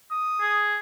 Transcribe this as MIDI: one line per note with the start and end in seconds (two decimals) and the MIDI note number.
0.11 0.63 87
0.41 0.79 68